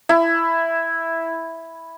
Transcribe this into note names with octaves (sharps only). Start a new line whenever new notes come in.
E4